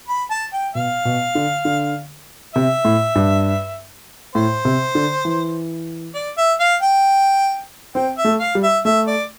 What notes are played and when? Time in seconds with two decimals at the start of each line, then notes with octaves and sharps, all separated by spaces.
0.08 B5
0.31 A5
0.53 G5
0.74 B2 F5
1.05 B2
1.35 D3
1.65 D3
2.55 C3 E5
2.85 A2
3.15 G2
4.35 A2 C5
4.65 C3
4.95 D3
5.25 E3
6.15 D5
6.38 E5
6.60 F5
6.82 G5
7.95 C4 G5
8.18 E5
8.25 A3
8.40 F5
8.55 G3
8.63 E5
8.85 A3 E5
9.07 D5